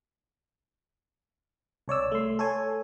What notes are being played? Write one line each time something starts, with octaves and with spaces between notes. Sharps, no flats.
C2 C#5 D5 E6
A3 C6
A4 C#5 G#5